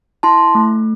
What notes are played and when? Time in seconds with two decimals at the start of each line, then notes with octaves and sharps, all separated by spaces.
0.23 E4 A5 C6
0.55 A3